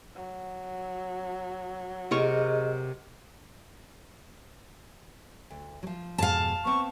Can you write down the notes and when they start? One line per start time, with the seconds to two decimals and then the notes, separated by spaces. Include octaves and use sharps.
0.15 F#3
2.11 C3 G#4 A#4 D#5 C#6
5.50 D2
5.83 F3 F#3
6.18 F2 G#2 B2 F5 A5
6.65 B3 C4 C#6